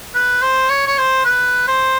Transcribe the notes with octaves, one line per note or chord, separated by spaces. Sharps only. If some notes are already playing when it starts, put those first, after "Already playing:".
B4
C5
C#5
C#5
C5
B4
C5